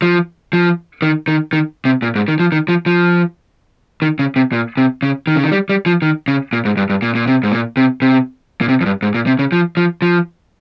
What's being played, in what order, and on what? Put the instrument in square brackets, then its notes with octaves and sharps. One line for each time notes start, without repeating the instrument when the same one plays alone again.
[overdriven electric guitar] F3
F3
D#3
D#3
D#3
C3
A#2
G#2
D#3
F3
D#3
F3
F3
D#3
C#3
C3
A#2
C3
C#3
D#3
C#3
D#3
G3
G3
F3
D#3
C#3
A#2
G#2
G2
G2
A#2
A#2
C3
G#2
A#2
C3
C3
A#2
C3
F2
G2
G#2
A#2
C3
C#3
F3
F3
F3